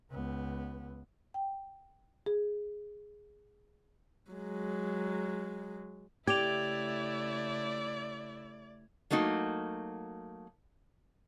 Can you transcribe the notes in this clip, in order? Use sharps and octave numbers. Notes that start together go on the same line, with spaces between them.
C#2 B3
G5
G#4
F#3 G#3
C#3 A3 E4 G4 D5 G#6 F7
F#3 A3 A#3 D#4 F#4